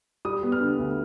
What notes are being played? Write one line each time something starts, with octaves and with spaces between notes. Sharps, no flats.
G3 D#6
B3
F6
D3
D2